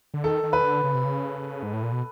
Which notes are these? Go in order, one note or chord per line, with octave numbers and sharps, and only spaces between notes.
D3
D#3 A4
D#3
B4
D3
C#3
C3
C#3
G#2
A2
A#2
B2